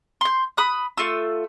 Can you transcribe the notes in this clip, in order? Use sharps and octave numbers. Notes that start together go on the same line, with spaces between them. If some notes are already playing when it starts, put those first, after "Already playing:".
C6 G6
B5 D#6 F#6
A3 F4 E6